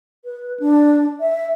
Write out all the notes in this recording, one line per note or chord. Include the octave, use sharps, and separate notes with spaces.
B4
D4
E5